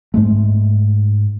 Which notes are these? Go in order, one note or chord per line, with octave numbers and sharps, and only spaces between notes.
G#2 G#3 A3